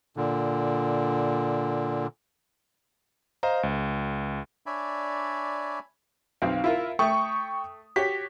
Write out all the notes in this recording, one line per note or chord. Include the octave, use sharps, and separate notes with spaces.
A#2 D3
C5 D#5 F5 A#5
C#2
D4 C#5 D5 E5 G#5 B5
B1 C4 F5
E4 F4 A#4
A3 G5 C#6 D#6
F#4 G4 C#5 B6